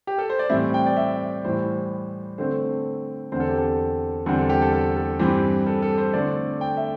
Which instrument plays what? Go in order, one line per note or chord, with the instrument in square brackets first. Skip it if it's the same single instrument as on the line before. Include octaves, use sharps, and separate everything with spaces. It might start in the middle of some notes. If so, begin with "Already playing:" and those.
[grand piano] G4
A4
C5
D5
A2 E3 G3 C4 E5
G5
D5
E5
A2 E3 G3 C5
D3 A3 C4 C5
E2 D3 C4 C5
A4
G4
A4
E2 D3 G3 C4
A4
G4
A4
A4
A4
G2 E3 C4 G4
A4
A4
C5
D3 A3 C4 D5
G5
E5